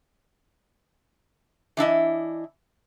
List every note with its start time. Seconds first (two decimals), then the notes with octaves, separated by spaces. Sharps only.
1.77 E3 D4 E4 D#5